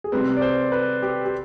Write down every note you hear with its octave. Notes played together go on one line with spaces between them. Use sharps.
G#4
C3 G3 C4 B4
D5
C5
B4
G4
G4